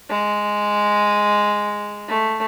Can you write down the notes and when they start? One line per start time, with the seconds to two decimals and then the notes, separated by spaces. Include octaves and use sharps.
0.10 G#3
2.08 A3